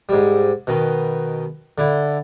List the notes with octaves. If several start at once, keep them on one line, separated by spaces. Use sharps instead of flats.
G#2 G3
B2 D#3
D3 E4